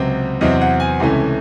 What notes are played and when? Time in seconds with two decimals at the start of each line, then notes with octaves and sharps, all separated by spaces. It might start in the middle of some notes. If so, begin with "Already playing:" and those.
Already playing: C#2 C3 F#3 C4
0.41 E2 C3 F#3 C4 D#5
0.61 F#5
0.80 G#5
1.00 C#2 C3 E3 A3 C#4